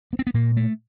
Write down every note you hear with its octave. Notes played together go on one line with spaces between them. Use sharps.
B3
C4
B3
A#2 A#3
A3